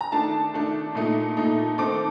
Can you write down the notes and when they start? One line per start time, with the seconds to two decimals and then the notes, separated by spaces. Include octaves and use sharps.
0.01 A#5
0.12 D#3 A3 D4 A5
0.54 D#3 A3 D4
0.95 A#2 A3 D#4
1.37 A#2 A3 D#4
1.78 D#3 A3 C4 D#4 D6